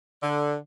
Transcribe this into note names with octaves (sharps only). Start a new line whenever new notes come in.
D3